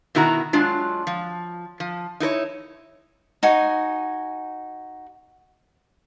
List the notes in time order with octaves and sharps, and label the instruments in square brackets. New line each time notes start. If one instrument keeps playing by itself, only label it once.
[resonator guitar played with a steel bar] B2 D#3 E4 F#4 A#5
F#3 G#3 D4 F4
F3
F3
D#4 E4 A#4 C#5
[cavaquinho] D#4 F#4 G#5